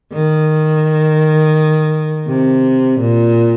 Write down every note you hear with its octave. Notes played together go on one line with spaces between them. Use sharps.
D#3
C3
A#2